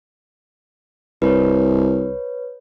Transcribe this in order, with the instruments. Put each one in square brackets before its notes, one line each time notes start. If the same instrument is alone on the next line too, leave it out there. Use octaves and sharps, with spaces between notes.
[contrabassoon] C2 [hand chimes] B4 C#5